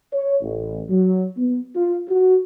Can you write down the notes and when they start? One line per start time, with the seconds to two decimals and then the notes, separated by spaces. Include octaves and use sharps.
0.12 C#5
0.41 A1
0.89 F#3
1.36 B3
1.74 F4
2.08 F#4